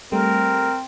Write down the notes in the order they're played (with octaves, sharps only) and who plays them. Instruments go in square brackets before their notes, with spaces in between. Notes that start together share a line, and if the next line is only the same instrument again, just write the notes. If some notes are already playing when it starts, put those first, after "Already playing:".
[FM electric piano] G3 A3 [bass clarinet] C4 [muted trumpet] A#4